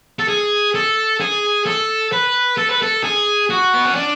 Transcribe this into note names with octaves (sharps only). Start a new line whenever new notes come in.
A4
G#4
A4
G#4
A4
B4
A4
B4
A4
G#4
F#4
B3
C#4
D4